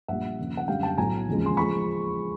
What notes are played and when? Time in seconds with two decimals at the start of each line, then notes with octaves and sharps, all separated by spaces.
0.08 A#1 A#2 G3 E5 F#5
0.39 D#2 C#3 F3
0.57 F#5
0.68 F#2 D3 G3 F5 G5
0.83 G5 A5
0.97 B1 A2 F#3 A3 G#5 A#5
1.27 E1 D#2 C#3 F3 G#3
1.46 C6
1.57 F3 G#3 B5 C#6